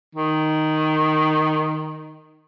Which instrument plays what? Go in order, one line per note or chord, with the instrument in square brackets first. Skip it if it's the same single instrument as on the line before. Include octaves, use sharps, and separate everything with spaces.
[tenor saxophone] D#3